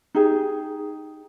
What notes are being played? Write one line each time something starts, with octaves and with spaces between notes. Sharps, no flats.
D#4 G4 G#4